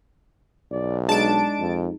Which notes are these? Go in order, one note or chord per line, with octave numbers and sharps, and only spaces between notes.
B1 D5
G#3 D4 D#4 A5 D7
F2